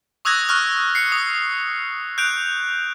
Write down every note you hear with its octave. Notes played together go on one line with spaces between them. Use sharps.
C#6 D#6 E6 F#6 G#6 A#6
C#6 F6 F#6
C7 C#7
D#6
F#6 G6 D7 F7